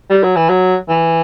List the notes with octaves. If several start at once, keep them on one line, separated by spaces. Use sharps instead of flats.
G3
F#3
E3
F#3
E3